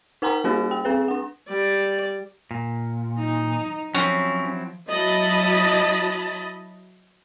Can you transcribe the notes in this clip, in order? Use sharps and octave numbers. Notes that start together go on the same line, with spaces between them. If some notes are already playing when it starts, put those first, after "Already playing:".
D#4 A#4 F#5 G#5 A#5 C6
G3 A#3 C#4 F#4 G#4 C5
G5
C4 G#4 B4
D4 F#5
G3 D5
A#2
D#4
F3 F#3 C4 C#4 E4
F#3 E4 D#5 A5 B5